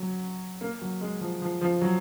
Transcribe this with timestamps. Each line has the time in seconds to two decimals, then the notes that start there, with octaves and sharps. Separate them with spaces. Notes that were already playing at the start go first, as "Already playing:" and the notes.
Already playing: F#3
0.61 A#3
0.81 F#3
1.01 G#3
1.21 F3
1.42 F3
1.61 F3
1.81 F#3